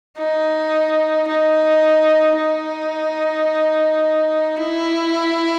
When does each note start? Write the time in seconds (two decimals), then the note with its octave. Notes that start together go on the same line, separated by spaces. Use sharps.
0.18 D#4
1.28 D#4
2.38 D#4
4.57 E4